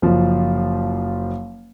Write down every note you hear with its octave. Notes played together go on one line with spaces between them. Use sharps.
F#1 F3